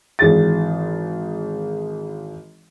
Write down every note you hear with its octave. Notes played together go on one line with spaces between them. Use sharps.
G#1 E3 G#4 A6